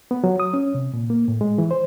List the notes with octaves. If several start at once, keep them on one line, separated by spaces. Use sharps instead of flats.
B3
F#3
D#6
C#4
C3
A#2
A#3
A2
G#3
E3
C5